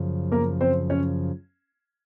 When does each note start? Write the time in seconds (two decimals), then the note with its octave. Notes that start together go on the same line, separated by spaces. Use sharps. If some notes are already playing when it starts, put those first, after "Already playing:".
Already playing: F#2 C#3 F3
0.32 A#3 A#4
0.61 C4 C5
0.90 C#4 C#5